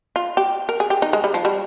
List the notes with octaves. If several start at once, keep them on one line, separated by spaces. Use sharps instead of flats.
F4
G4
A#4
G#4
G4
D#4
G#3
G3
F3
G3